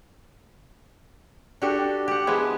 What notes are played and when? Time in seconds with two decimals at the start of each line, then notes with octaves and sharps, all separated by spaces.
1.62 D4 F#4 G4 A4
2.08 G4 F#5
2.27 F3 G#3 B3 E4